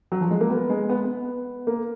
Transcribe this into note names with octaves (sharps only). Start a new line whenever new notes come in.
F#3
F3
G#3
A#3
B3
G#3
B3
B3
A#3